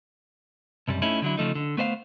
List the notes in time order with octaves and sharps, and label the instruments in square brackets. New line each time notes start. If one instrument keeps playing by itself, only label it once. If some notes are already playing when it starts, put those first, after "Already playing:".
[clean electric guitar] B1 F#2 C3 G3
A3 C#4 D#4 E4
D3 F#3 E4
C#3 F3 A3 D#4
D3
A3 B3 C5 D#5 F5